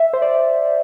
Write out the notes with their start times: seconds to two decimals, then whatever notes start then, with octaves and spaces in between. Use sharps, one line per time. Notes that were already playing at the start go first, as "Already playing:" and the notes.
Already playing: E5
0.13 C5
0.22 D5